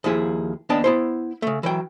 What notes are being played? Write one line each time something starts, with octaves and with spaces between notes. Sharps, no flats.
D#2 F3 E4 G#4
D#2 B3 D4 D#5 G5 A5
B3 E4 C5
C#3 A3
E3 F#3 G5